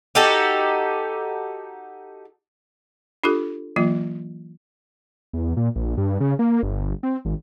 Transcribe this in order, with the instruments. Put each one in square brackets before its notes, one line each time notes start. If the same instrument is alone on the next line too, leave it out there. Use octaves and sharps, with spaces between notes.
[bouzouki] D#4 F#4 G4 A4
[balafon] D4 F4 G4 A4
E3 F#3 A#3 F4
[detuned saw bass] E2
A#2
A#1
G2
C#3
A#3
G1
C4
G#1